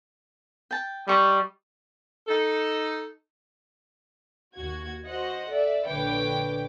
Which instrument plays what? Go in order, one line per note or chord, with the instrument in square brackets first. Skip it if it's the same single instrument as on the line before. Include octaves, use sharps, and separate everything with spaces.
[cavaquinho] G5 A5
[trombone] G3 [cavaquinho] D#5 C#6
[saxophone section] D#4 A4
[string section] D#2 F#4 G#6
F#4 C5 D#5 F#5
A4 D5 E5
A#1 D3 B4 C#5 G5 D6